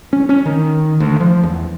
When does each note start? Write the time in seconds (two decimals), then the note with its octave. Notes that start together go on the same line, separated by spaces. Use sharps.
0.13 C#4
0.29 C#4
0.46 D#3
1.00 D2
1.20 F3
1.43 E2